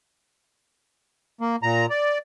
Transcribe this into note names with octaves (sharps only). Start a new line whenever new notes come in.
A#3
A#2 A#5
D5